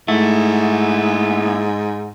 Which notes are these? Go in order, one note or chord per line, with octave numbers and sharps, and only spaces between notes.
G#2 A3 A#3 E4 F#5